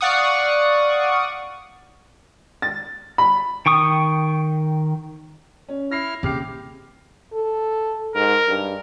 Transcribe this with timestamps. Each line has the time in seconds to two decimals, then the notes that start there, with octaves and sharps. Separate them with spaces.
0.01 D5 F5 F#5 C#6 D#6
2.62 A6
3.18 B5
3.66 D#3 G5 C#6 D#6
5.69 C#4
5.91 E4 F6 A#6 C7
6.23 C#3 A#3 C4 G4 F6 C7
7.33 A4
8.15 G#2 A#4
8.48 G2